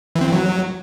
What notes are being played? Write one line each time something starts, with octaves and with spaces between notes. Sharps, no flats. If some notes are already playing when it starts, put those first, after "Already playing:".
E3
C4
E3
F#3